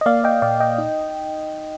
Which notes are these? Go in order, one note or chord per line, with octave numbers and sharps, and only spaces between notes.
D#5
A#3 D5 F5
D#5 G5
A#2 D5 F5
D#5 G5
D#4